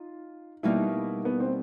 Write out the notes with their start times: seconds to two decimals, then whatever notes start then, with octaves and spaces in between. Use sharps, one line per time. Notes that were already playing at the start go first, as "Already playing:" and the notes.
Already playing: D#4 F4
0.63 B2 G3 A#3 D#4 E4 G4
1.25 B3
1.40 C4